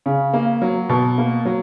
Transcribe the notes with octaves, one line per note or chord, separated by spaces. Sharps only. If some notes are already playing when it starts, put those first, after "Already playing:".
C#3
A#3
F#3
B2
A#3
F#3